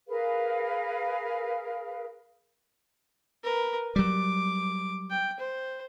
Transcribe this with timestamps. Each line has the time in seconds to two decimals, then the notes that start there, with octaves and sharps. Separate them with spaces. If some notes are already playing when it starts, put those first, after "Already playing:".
0.08 G#4 A#4 B4 F5
3.43 A#4 B4
3.96 F#3 G3 D6
5.11 G5
5.39 C5